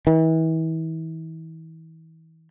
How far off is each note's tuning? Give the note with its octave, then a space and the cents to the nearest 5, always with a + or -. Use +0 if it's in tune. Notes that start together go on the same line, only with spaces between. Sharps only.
E3 -35